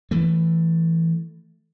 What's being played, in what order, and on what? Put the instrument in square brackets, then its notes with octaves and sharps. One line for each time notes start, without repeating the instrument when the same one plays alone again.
[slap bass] E3 A3